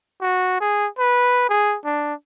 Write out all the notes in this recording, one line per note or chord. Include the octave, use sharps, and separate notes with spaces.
F#4
G#4
B4
G#4
D4